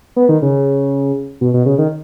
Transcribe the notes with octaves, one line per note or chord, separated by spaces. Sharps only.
B3
D#3
C#3
B2
B2
C#3
D#3